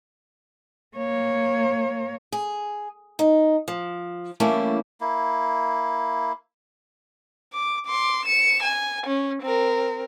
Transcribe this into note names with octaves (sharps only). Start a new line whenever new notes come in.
A#3 C#5
G#4
D#4
F3
E3 G3 A3 A#3 C#4 E4
A#3 E4
D6
C6 D6
C#7 E7
G#5
C#4
C4 A#4